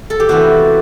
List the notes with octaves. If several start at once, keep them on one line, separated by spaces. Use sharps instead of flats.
A4
G4
C3 E3 B3 F#4